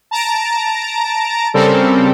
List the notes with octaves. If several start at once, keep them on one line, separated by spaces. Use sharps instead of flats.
A5 A#5 D7
C#3 G3 C4 A4 A#4